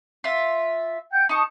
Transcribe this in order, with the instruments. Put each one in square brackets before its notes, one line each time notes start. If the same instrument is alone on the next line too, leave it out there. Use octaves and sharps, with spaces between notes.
[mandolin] F4 E5
[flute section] F#5 G5 G6
[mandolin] D#4 C#6 [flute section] A5 D#6